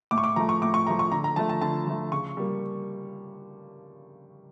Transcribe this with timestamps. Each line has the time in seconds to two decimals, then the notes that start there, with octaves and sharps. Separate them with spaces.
0.11 A2 D6
0.18 C#6
0.24 D6
0.36 F3 A3 A#5
0.49 C#6
0.61 A2 D6
0.74 C#6
0.87 F3 A3 A#5
0.99 C#6
1.12 D3 A#5
1.24 A#5
1.36 F3 A3 A5
1.49 A5
1.61 D3 A5
1.87 F3 A3
2.12 C#3 C#6
2.37 G3 A#3